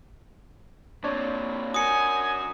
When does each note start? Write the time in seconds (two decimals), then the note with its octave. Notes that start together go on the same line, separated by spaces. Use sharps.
1.04 A#2 C4 D4 C#5 D5
1.74 F#4 A#4 G#5 D#6 C#7